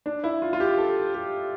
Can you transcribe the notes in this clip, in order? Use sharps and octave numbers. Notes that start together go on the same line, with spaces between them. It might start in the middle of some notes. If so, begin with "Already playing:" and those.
D4
E4
F4
F4
G4
A4
G4